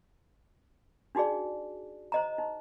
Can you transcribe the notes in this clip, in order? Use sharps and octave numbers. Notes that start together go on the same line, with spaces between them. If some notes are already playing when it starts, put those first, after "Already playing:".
D4 D#4 F#4 G#4 D5
C5 D#5 A#5
D#4